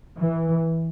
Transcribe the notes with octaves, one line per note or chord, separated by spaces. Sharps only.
E3